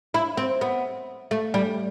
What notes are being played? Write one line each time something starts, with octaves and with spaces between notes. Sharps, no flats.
E4
C4
B3
A3
G3